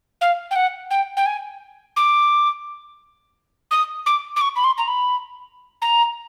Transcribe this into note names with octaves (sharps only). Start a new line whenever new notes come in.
F5
G5
F#5
G5
G5
G#5
D6
D#6
D6
D6
C#6
B5
C6
A#5
B5
A#5